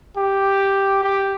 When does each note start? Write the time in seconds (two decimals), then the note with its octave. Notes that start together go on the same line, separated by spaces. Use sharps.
0.17 G4
1.03 G4